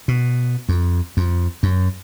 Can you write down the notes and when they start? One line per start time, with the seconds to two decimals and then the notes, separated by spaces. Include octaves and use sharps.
0.08 B2
0.69 F2
1.17 F2
1.63 F#2